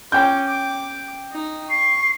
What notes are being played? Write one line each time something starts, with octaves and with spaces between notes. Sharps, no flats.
C#4 G5 D6 G6
D6
D#4
C#6 C7